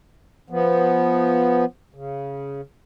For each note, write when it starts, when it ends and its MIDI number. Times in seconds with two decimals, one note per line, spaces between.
0.50 1.65 53
0.50 1.65 59
1.94 2.61 49